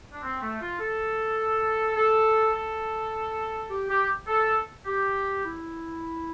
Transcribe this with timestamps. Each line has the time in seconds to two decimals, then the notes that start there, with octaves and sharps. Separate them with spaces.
0.12 D4
0.22 C4
0.42 A3
0.61 F4
0.80 A4
1.96 A4
2.54 A4
3.70 G4
3.89 G4
4.27 A4
4.86 G4
5.44 E4